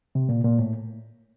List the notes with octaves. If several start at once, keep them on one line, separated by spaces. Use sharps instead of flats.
C3
A#2
A#2
A2